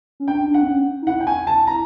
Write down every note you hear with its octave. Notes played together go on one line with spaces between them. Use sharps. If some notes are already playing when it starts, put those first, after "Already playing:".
C#4
D4 G5
D4
F#5
C4
C#4
D#4
E4 F#5
G5
G#5
A5
A#5